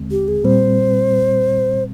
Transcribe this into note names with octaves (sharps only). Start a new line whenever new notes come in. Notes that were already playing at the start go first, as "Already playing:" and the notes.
Already playing: D#2 D3 G#3 C4
G4
G#4
A#2 G3 C4 C5